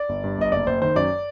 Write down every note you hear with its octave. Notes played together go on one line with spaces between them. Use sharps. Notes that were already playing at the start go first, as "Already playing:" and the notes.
Already playing: D5
G1
G2
G1 D#5
F#1 D5
F#1 C5
D#3 C5
F#2 D5